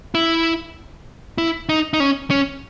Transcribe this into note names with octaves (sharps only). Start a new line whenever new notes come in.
E4
E4
D#4
D#4
C#4
C#4